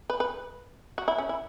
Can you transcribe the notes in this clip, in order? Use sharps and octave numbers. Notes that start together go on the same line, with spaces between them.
B4
B4
F#4
E4
C#4
E4